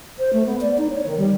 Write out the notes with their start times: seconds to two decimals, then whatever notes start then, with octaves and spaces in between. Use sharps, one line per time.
0.19 C5
0.33 A3
0.46 B3
0.61 D5
0.78 D#4
0.90 C#5
1.06 D#3
1.18 G3